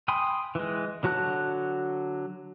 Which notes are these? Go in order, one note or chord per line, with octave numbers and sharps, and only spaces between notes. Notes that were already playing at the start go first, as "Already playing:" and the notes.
G5 G#5 B5 C6 D#6
E3 G#3
D3 F#3 F#4 A5 F#6